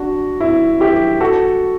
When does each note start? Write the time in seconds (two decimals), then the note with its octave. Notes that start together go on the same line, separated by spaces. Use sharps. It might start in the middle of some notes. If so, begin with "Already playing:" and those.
Already playing: D4 F#4
0.41 E4
0.80 E4 G4
1.21 F#4 A4